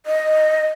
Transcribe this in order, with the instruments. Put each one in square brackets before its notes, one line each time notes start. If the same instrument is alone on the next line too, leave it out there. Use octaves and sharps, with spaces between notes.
[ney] D#5